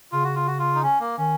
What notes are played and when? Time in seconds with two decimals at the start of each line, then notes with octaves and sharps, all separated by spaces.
0.12 C#3 F4
0.24 F#4
0.35 F4
0.47 F#4
0.59 F4
0.75 D#4
0.83 C#4
1.00 A#3
1.18 D#3 C#4